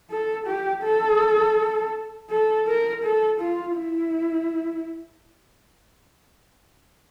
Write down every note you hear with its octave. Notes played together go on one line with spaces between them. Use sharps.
A4
G4
A4
A4
A#4
A4
F4
E4